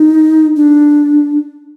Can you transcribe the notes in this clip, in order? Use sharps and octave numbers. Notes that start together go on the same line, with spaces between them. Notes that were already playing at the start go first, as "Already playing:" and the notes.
Already playing: D#4
D4